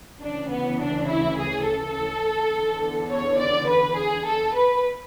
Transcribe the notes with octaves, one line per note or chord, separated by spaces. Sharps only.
D2 C#3 E3 D4
B3
D4
E4
G#4
A4
E2
D3
C#5
D5
B4
G#4
A4
B4